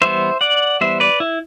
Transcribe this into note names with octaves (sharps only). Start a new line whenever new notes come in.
E3 G3 B3 C5 E5
D5 F#5
E3 G3 B3 C5 E5
B4 D5
E4